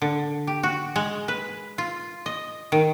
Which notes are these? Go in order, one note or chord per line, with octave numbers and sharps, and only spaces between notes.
D3
G4
F#4
G#3
B4
F4
D#5
D#3